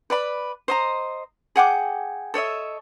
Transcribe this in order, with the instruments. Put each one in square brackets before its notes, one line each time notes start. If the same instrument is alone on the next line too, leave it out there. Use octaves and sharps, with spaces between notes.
[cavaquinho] B4 D5 B5
C5 D#5 A#5
G#4 F#5 G5 D6
A4 C#5 D#5 E5